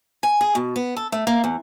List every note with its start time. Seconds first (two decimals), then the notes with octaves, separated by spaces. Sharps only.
0.23 G#5
0.41 G#4
0.55 B2
0.76 B3
0.97 A4
1.12 A3
1.27 A#3
1.44 E2